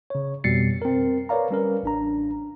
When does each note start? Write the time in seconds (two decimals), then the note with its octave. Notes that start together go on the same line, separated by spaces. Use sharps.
0.10 C#3 C#5
0.44 F2 B2 G3 A6 C7 C#7
0.82 C4 A#4
1.29 A#4 B4 C#5 D5 F5 A#5
1.51 G3 C#4 A#4 B4
1.83 A1 D4 A#5